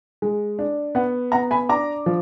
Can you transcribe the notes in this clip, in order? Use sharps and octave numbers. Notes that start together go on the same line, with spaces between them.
G#3
D4
B3 F#5
B3 F#5 A#5
G#5 B5
D4 A#5 D6
F3